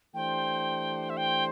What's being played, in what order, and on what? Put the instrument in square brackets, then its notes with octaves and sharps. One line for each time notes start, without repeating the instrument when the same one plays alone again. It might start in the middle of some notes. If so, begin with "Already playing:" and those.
[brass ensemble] E3 A3 D4 G4 C5 [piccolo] G5
[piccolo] E5
G5